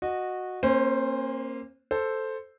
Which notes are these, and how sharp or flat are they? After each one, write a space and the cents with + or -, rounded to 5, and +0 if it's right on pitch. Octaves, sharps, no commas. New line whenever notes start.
F#4 -10 D#5 -15
A#3 +0 C#4 -45 C5 -5
A4 +0 C5 +0